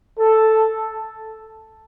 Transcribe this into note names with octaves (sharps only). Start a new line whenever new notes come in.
A4